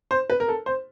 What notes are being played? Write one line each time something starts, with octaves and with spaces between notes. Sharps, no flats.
C5
B4
A#4
A4
C5